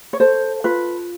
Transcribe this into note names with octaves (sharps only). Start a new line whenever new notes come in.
C#5
A4 C5
F4 B4